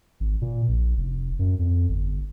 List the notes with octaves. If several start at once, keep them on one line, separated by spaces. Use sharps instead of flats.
G#1
A#2
A#1
F1
F#2
F2
G1